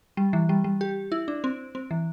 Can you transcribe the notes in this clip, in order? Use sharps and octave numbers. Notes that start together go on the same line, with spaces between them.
G3
E3
G3
G3
G4
E4
D4
C4
C4
E3